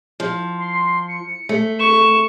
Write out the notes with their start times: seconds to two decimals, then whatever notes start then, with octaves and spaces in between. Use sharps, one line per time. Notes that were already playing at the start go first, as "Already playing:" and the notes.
0.20 F3
0.59 C6
1.08 C#7
1.49 A3
1.79 C#6 E7